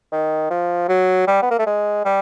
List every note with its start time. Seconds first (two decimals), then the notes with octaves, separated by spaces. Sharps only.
0.12 D#3
0.50 F3
0.88 F#3
1.27 G3
1.42 B3
1.51 A#3
1.59 A3
1.66 G#3
2.05 G3